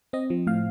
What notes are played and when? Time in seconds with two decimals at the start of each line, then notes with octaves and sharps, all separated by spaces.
0.13 C4 D#5
0.30 F3
0.47 A2 F5